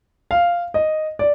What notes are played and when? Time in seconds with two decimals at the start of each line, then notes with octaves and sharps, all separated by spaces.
0.31 F5
0.74 D#5
1.19 D5